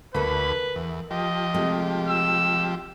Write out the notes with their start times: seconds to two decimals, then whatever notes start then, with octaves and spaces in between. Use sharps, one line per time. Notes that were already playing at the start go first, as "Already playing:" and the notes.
0.15 D2 A#3 A4 B4 B5
0.76 E2
1.11 F3 G4 D#5
1.54 C3 G#3 A3
2.07 E6